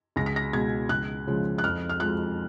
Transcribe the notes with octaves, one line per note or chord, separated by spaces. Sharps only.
C#2 A#6
B6
A#6
B2 G#3 G#6
C#2 F#6
C#3 F3 G#3
F#6
F2 F6
F6
F3 G#3 F#6